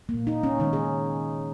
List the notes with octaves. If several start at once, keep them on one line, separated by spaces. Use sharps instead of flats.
A#2 A#3
D#4
C#4
D#3 G#3 D#4
G#4